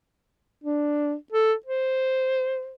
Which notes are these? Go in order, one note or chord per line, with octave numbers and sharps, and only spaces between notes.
D4
A4
C5